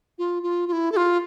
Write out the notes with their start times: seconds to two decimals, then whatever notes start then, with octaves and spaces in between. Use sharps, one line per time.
0.18 F4
0.43 F4
0.68 F4
0.73 E4
0.92 A4
0.97 F4